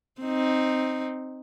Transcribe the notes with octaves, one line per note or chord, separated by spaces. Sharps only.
C4 D#4